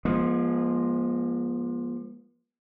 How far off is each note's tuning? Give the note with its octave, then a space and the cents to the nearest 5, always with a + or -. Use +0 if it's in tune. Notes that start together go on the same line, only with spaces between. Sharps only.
F3 +0 G#3 -10 B3 -45